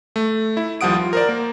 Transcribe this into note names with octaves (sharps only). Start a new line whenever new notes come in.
A3
E4
D#2 F3 G3 F#5 D#6 D7
F4
A#4 C5 D5
A#3